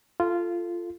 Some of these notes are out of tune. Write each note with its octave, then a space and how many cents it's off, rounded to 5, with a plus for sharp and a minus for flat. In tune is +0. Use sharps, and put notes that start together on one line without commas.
F4 -15 A4 +0